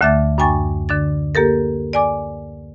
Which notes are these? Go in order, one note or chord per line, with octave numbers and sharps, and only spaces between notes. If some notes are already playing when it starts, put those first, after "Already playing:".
D2 D3 A3 E5 D6 A6
F#2 D4 G5 G#5 C#6 A6
D3 D4 A6
A#3 G4 A4 A#4
D5 G#5 D6